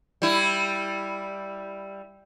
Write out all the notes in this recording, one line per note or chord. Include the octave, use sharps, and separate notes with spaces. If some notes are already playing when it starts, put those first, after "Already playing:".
G3 E4